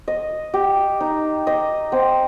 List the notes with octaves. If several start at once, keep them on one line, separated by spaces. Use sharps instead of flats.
D#5
G4
D#4
D#5
C4